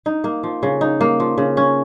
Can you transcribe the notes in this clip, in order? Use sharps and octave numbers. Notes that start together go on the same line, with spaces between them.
D#4
A#3
F3
C#3
D#4
A#3
F3
C#3
C#4